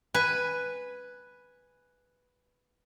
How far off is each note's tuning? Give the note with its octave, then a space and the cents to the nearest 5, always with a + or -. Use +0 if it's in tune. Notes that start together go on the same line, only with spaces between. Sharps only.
B4 +0 G#5 +0